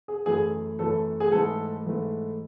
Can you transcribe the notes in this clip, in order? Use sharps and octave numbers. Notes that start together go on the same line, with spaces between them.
G#4
F#2 E3 A3 G#4
F#2 E3 A3 A4
G#4
G#2 E3 A3 A4
G#2 E3 A3